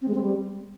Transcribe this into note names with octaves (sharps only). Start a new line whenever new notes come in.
C4
G#3
C4
G3